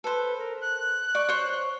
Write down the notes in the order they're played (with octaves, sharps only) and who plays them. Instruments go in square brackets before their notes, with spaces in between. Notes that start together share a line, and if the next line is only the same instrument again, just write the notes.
[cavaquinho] A4 C5 [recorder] B4
[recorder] A#4
F#6
[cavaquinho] D5 C#6
C5 C#5